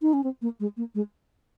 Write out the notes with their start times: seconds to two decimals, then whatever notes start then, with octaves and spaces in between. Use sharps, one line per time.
0.02 D#4
0.13 C#4
0.24 C4
0.42 A#3
0.60 G#3
0.77 A#3
0.95 G#3